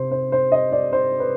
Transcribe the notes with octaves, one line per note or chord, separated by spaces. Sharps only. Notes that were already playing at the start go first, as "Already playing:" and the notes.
Already playing: C3 C4 C5
C5
C5
D#5
D5
C5
B4